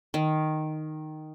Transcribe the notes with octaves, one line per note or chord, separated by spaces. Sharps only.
D#3